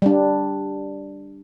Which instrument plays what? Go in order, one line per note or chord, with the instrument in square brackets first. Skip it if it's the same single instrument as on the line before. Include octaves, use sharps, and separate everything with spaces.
[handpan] G3 D4